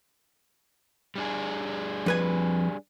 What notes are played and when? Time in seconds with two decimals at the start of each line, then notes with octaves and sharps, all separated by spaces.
1.16 G3 D4 G#4
2.06 F2 B4 G#5